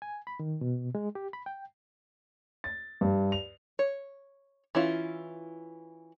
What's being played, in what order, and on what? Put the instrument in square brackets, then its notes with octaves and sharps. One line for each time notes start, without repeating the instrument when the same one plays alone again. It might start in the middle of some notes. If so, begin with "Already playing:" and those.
[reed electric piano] G#5
B5
D#3
B2
G#3
G4
B5
G5
[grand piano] A6
G2
F7
[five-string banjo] C#5
E3 C#4 E4 F4